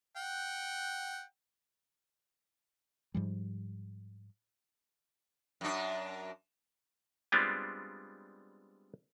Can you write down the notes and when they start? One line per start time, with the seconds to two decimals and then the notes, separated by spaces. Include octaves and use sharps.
0.17 F#5 G5
3.14 G#2 F3 G3
5.61 F#2 D4
7.32 G3 G#3 B3 C4 D4 F4